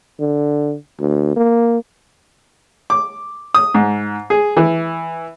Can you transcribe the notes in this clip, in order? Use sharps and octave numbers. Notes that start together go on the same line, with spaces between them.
D3
D2
A#3
D6
D#6
G#2
G#4
E3